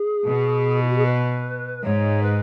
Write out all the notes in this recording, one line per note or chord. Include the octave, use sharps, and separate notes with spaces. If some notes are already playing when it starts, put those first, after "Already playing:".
Already playing: G#4
B2
E4
F#4
G#4
B4
G#2 C#5
B4